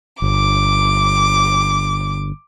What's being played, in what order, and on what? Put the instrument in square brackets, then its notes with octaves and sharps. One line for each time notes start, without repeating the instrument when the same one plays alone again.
[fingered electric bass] G1 [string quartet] D6